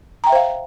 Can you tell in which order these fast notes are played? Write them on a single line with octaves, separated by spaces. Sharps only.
A#5 G5 E5 C5 F5